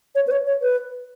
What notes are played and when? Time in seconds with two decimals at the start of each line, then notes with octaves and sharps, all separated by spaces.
0.15 C#5
0.27 B4
0.31 C#5
0.46 C#5
0.62 B4